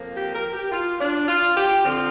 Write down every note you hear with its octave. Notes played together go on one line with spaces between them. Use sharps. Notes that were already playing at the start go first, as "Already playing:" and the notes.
Already playing: F2 F3 A#3
G4
A#4
G4
F4
D4
F4
G4
F2 D3 F3 C4 F4